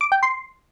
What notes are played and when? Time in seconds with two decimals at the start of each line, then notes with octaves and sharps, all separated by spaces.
0.01 D6
0.12 G5
0.23 C6